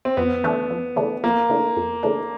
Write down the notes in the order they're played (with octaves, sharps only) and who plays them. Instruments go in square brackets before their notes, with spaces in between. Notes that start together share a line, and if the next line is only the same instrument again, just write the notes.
[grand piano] C4
[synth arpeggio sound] F2 [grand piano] B3
[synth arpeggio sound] C#3 E3 A3 D4
F2
C#3 E3 A3 D4
[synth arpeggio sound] F2 [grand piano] A#3
[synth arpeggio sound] C#3 E3 A3 D4
F2
C#3 E3 A3 D4